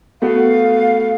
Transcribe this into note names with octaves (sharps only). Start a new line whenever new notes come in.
A3 B3 F#4 F5